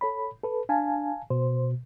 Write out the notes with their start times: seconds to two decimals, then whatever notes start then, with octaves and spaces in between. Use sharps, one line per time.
0.01 A4 C#5 B5
0.43 A4 B4
0.69 D4 F5 G#5 A5
1.30 B2 C5